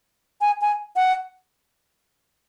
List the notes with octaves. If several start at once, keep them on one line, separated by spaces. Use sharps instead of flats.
G#5
G#5
F#5